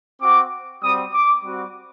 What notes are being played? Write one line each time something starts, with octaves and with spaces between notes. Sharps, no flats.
C4 F#4 D6
G3 C4 F#4 D#6
D6
G3 C4 F#4